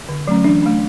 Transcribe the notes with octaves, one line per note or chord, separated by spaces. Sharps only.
D3
F#3 A3 C#4
E3 D4
A3 D4